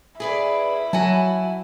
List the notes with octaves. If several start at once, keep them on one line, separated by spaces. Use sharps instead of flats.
E4 G#4 B4 D5
F#3 F#4 G#5 A5